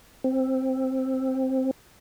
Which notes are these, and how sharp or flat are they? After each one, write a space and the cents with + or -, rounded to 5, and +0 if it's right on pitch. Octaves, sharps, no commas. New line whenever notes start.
C4 +5